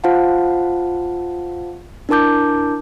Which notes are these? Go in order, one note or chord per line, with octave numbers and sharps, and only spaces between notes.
F4 C5 F5 F#5 A5
D4 E4 A#4 A5 D6 G6